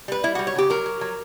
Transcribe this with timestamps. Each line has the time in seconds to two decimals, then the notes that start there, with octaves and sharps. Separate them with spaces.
0.08 G3 B4
0.24 G3 E4
0.35 G3 F#4
0.47 C#5
0.55 C#3 G4
0.70 F#3 A#4
0.86 F#3
1.01 F#3